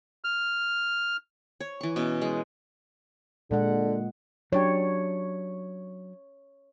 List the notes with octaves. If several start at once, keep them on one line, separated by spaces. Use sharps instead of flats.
F6
C#5
E3 C#6
B2 C#4 E5
G#3
A#2 D3 G#3 F#5
F#3 D4 G4 C#5